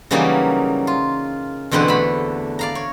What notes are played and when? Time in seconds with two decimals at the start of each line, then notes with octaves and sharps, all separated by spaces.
0.11 C#3 E3 F#3 G3 A#3 D#4
0.87 F4
1.71 E2 B2 D3 C4 B4 F#5
1.88 A3 B5
2.59 D5 F5 A#5
2.75 C#5